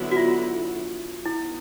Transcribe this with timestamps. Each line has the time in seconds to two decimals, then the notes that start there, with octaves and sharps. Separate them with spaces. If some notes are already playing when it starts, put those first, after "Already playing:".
Already playing: D3 F#3 B3 E4
0.11 F#4
0.17 F4
1.26 B3 D#4 E4 F#4